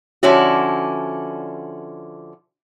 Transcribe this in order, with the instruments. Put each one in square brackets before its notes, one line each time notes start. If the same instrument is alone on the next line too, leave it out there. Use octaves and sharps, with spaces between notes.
[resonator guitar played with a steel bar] D3 F3 C#4 E4 F#4